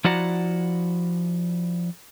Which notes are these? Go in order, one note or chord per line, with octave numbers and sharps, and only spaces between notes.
F3 E4 F#4 D5 F#5 A#5